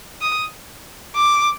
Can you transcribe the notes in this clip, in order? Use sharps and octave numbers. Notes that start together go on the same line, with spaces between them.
D#6
D6